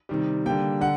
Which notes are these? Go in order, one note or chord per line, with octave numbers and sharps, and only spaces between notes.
C3 D#3 G3
D3 G3 A#3 G5
D3 F#5